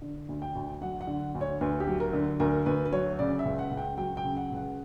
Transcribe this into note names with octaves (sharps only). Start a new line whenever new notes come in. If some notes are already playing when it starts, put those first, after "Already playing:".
D3
D2
G5
D2
F#3 F#5
F#5
D3
D2
C#5
D2 B4
G4
F#3
A#4
D3
D2 A#4
D2 B4
B4
F#3 C#5
C#3 D5
E5
C#2
F#5
C#2
G5
F#3 G5
G5
C#3
F#5
C#2
F#5